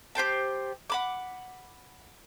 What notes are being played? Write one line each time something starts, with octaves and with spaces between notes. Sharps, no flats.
G4 C5 G5 A5
F#5 B5 D6